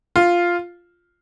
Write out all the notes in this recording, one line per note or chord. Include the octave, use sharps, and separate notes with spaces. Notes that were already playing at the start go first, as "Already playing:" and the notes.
F4